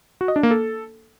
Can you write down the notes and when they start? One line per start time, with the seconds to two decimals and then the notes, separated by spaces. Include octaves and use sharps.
0.21 F#4
0.28 D#5
0.36 D4
0.43 A#3
0.51 A4